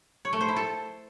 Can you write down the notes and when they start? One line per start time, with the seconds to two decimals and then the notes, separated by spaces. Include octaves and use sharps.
0.25 C#5
0.33 A3
0.41 C5
0.49 E4
0.56 A4